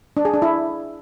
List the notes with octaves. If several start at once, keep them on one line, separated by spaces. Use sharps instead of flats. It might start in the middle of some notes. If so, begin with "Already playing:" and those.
D4
G#4
D4
E4